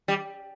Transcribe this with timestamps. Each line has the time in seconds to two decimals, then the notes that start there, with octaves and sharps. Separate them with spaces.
0.08 G3